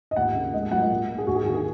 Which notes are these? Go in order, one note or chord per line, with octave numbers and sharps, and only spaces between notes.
D#5
D#2 F#5
C#3 A#3
G#2 D#5
F#3 A#3 F#5
D#5
A#2
A#3
G#4
D#2 F#4
G#4
D#3 A#3 F#4
G#4